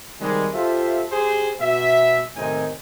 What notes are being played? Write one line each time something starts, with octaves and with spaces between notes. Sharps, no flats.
C3 D#3 G3 G#3
F4 G4 A4 C5 E5
G4 G#4 C5
B2 E5
A2 C3 D#3 C4 D#4 G#5